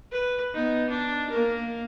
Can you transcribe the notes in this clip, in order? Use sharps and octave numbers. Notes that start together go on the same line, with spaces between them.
B4
B3 D#4
D4
A#3 A#4